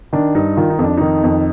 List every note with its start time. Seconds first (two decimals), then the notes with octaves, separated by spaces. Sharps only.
0.13 D#3 D4
0.34 G2 D#4
0.57 D#3 F4
0.70 D#4
0.79 F2
0.84 D4
0.97 D#3 D#4
1.24 F2